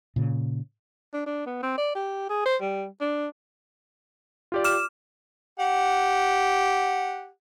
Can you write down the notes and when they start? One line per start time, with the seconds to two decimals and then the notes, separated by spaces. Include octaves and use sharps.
0.16 A#2 C#3
1.13 D4
1.26 D4
1.46 B3
1.63 C4
1.78 D5
1.95 G4
2.30 G#4
2.45 C5
2.62 G3
3.01 D4
4.52 F4 G4 D5
4.64 D6 F6 E7
5.59 G4 F#5